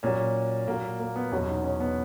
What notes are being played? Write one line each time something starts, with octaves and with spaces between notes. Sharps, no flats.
A#2 F#3 C#4
A#2 F#3 A#3
A#3
B3
E2 B2 F#3 C#4
D#4
C#4
B3